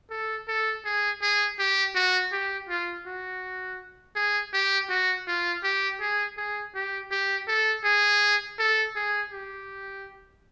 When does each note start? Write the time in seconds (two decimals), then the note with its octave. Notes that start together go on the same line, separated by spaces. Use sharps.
0.10 A4
0.48 A4
0.85 G#4
1.22 G#4
1.59 G4
1.95 F#4
2.32 G4
2.69 F4
3.06 F#4
4.16 G#4
4.53 G4
4.90 F#4
5.27 F4
5.64 G4
6.01 G#4
6.37 G#4
6.75 G4
7.11 G4
7.48 A4
7.84 G#4
8.59 A4
8.96 G#4
9.32 G4